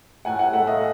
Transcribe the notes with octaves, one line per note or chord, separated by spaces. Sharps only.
A2 F#5 G#5
F#5 G#5
A3 E5 F#5
D#5 F5